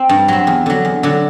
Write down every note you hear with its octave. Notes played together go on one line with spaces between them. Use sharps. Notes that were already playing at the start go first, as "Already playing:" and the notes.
Already playing: C4
G2
F#3 C4
E2
D3 F#3
E2
D3 F#3